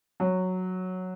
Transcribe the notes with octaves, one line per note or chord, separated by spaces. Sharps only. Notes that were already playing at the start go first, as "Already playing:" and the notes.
F#3